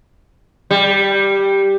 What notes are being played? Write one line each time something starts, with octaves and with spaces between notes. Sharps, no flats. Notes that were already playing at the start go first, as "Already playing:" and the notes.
G3